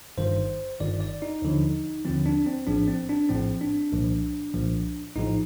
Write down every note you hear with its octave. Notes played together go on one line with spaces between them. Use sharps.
G1 G2 D#3 C5
G1 G2 D#3 D5
D5
D#4
D#2 D3 F3
D#2 D3 F3 C4
D4
C4
A#1 A2 F3 D4
C4
D4
A#1 A2 F3 C4
D4
C2 A#2 F3
C2 A#2 F3
A#1 A2 F3 D#4